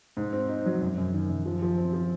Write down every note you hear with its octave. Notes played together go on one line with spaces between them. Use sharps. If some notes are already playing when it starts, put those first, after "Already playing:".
G#2
C4
D#4
F#3
F#2
F#2
D#3
F#2
F3
F3
C4
F3